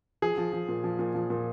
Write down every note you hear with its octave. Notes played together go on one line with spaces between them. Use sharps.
F3 G#4
F3
F3
A#2
F3
A#2
F3
A#2